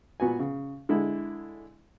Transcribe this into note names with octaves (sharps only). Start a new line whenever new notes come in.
A#2 B3 F#4 G#5
C#3
D3 G#3 E4